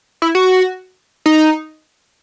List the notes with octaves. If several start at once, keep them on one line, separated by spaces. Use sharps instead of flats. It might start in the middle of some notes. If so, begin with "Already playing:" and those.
E4
F#4
D#4